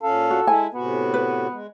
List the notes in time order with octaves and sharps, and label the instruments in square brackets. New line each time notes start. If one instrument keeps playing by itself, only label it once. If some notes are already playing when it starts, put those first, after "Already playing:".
[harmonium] A#2 C#4 F5 [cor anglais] A4
[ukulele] F#4
[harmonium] G#3 E4 [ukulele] G#5
[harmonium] A2 C3 F#4 [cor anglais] B3
[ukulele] B4
[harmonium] G#3